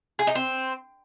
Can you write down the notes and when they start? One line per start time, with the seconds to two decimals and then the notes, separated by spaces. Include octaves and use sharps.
0.19 G#4
0.27 D#4
0.35 C4